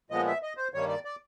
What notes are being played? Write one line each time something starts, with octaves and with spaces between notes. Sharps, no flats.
A#2 F3 G#3 B3 D#5
E5
D#5
C5
G2 D#3 G3 A#3 C#5
D5
D5